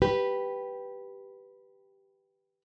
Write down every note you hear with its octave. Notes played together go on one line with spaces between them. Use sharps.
G4 B4